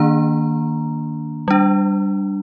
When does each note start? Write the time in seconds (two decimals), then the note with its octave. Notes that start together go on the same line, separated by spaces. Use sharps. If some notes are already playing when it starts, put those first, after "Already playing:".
Already playing: D#3 A#3 D4 A#5
1.48 G3 D4